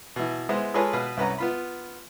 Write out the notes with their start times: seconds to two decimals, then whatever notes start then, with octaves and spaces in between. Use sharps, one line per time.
0.16 B2 E3
0.49 G#3 B3 E4 C5
0.74 G#3 F4 G#4 A4 B4 C#5
0.93 B2 B4 F5
1.17 C2 C#4 B4 F#5 A#5
1.38 B3 F4 B5